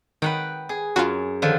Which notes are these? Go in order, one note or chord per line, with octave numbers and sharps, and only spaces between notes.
D#3 B4 F#5 G5
G#4
F#2 F4 F#4
D3 D#3 F3